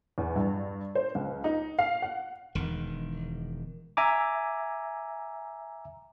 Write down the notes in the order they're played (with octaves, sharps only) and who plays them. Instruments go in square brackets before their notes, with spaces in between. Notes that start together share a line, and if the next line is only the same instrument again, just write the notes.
[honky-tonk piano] E2
G2
C5
C#2
D#4
F5
F#5
[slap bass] E1 D#3
[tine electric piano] E5 G#5 A#5 D6